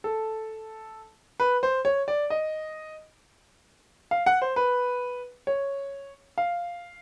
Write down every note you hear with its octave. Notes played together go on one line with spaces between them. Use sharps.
A4
B4
C5
C#5
D5
D#5
F5
F#5
C5
B4
C#5
F5